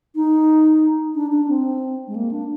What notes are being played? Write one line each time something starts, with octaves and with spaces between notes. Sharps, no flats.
D#4
D4
D4
C4
G#3
A#3
D4